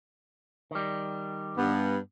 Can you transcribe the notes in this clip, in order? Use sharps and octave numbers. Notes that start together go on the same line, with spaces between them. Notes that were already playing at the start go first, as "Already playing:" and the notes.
D#3 G3
G2 B3